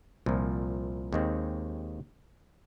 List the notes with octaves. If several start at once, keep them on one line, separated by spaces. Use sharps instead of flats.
C2 A#2 F3
D#2 D#3 G#3 C4